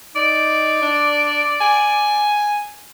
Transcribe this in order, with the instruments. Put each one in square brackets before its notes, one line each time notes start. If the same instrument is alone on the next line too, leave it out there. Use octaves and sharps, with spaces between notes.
[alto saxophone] D#4 [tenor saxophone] D5
[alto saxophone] D4
G#5